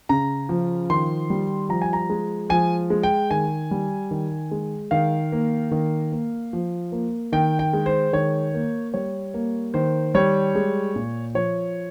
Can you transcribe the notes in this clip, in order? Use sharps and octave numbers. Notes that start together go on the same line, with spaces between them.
C#3 A#5
F3
D#3 C6
G3
F3 A#5
G#5
A#5
G#3
F3 G#5
G#3
G5
D#3 G#5
G3
D#3
G#3
D#3 F5
A#3
D#3
A#3
F3
A#3
D#3 G5
G5
G#3
C5
D#3 C#5
A#3
G3 C#5
A#3
D#3 C5
G3 C#5
G#3
A#2
F3 C#5